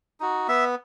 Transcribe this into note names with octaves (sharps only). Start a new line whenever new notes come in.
D#4 F#4
B3 E5